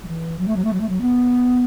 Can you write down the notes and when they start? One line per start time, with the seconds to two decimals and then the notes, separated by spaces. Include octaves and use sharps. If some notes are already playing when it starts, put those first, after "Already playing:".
0.04 F#3
0.08 E3
0.39 F#3
0.47 A3
0.56 F#3
0.64 A3
0.73 F#3
0.80 A3
0.89 F#3
1.01 B3